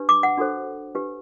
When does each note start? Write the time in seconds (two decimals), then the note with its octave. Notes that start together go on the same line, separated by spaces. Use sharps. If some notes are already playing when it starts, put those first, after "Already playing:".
Already playing: D4 G4 B4
0.09 D6
0.23 F#5
0.37 D4 F#4 A4 C5
0.95 D4 G4 B4